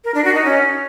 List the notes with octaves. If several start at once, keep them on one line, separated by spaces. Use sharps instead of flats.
A#4
D4
F#4
D#4
C#4